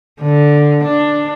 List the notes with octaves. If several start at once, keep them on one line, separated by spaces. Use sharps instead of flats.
D3
D4